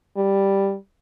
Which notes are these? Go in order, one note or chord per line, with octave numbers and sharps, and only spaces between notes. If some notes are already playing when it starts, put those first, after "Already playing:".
G3